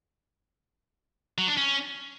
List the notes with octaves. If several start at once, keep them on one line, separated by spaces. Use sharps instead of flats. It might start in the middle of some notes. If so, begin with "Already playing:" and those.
F#3
D4
C#4